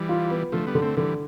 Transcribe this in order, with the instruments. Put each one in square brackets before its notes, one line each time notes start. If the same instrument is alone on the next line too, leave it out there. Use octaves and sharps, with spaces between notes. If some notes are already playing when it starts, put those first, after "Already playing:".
Already playing: [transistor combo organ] E3 G3
[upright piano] F4
B3
[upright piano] D3 [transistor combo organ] F3 A3
[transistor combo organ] G3 B3
[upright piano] D3
[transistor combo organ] A3 C4
[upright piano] D3 [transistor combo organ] E3 G3